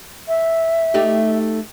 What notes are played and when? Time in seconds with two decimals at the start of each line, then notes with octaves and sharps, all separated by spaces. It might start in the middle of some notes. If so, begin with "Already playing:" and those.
0.28 E5
0.94 A3 D#4 G4